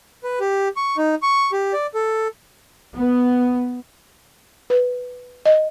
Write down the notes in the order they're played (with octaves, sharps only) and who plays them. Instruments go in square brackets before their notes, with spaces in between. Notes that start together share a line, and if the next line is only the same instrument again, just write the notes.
[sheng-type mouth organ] B4
G4
C#6
D#4
C#6
G4
D5
A4
[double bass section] B3
[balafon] B4
D#5